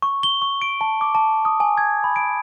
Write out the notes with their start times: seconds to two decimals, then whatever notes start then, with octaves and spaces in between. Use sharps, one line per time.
0.02 C#6
0.23 G7
0.42 C#6
0.62 D7
0.81 A5
1.01 D6
1.15 A5
1.45 D#6
1.60 G#5
1.78 G#6
2.04 B5
2.16 D7